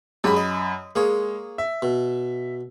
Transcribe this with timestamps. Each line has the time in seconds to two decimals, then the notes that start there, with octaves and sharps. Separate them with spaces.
0.24 F#2 G#3 G4 B5
0.36 D#5
0.96 G#3 A#3 G#4 C#5
1.58 E5
1.82 B2